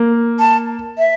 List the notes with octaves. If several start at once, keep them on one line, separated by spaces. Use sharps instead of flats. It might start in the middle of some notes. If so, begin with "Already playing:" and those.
Already playing: A#3
A5
E5